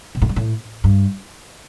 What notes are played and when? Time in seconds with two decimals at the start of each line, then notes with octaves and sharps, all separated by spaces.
0.15 B2
0.22 A2
0.29 G2
0.36 A2
0.84 G2